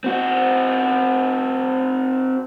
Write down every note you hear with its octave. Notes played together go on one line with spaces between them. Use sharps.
C4 F#4